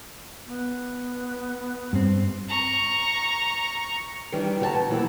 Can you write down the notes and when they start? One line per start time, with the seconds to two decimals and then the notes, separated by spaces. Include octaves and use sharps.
0.46 B3
1.93 G2 C4
2.49 A#5 C#6
4.32 D#3 E3 G3 D4 E4
4.60 D3 F#4 G4 D#5 A5 A#5
4.74 B2
4.90 E3 F3 G3 A#3 B3 E4